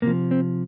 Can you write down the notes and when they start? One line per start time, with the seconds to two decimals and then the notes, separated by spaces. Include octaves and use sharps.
0.02 C3 F3 A#3
0.31 C4